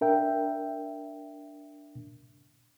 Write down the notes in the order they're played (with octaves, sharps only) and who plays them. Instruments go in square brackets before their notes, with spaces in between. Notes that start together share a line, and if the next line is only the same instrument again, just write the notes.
[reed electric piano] D4 A#4 E5 G5